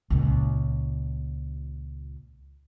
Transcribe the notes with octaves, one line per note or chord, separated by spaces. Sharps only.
C#2 A#2